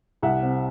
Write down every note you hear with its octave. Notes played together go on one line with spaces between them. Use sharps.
C2 E5 F#5
C3